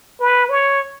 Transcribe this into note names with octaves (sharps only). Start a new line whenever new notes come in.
B4
C#5